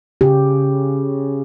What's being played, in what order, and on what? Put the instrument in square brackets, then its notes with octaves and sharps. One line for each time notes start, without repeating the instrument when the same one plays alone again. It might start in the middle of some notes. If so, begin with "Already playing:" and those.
[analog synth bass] C#3 [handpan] G4